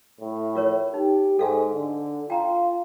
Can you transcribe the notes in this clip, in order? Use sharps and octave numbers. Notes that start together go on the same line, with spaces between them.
A2
F4 A#4 C#5
D#4 G4
G#2 A4 F5 G#5
D3
F4 G5 A#5